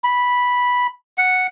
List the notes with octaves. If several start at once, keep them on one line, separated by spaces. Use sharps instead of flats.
B5
F#5